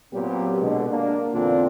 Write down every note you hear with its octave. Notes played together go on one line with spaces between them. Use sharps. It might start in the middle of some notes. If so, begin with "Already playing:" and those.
A#2 F#3 B3 C4 G4
B2 D3 G#3
A#3 D4
E2 A#2 D3 C4 D4 F4